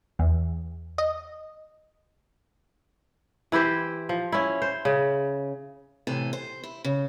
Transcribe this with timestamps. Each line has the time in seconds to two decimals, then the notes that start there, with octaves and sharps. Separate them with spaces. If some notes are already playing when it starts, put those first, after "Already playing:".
0.19 E2
0.98 D#5
3.52 E3 E4 G4 C5
4.09 F3
4.32 C#4 E4
4.62 C5
4.85 C#3
6.07 A2 C3 E3 A4 G#5
6.33 C5
6.64 E4
6.85 C#3